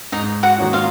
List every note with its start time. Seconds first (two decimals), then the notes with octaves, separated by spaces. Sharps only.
0.12 G#2 D#4 D#5
0.43 F#4 F#5
0.58 D#3 A#3 C#4 F#4
0.73 F4 F5